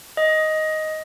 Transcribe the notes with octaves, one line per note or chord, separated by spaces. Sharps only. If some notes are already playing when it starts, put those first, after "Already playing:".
D#5